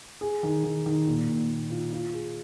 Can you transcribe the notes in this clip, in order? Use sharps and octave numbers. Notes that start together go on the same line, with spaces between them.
G#4
D#3
D#3
D#3
A#2
A#2
A#2
F4
F4
G#4